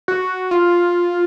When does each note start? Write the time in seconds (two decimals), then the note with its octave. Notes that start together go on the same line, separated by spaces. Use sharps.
0.08 F#4
0.51 F4